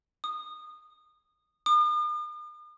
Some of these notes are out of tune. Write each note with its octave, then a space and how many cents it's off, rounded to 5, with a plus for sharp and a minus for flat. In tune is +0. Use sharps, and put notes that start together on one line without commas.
D#6 -20
D#6 -45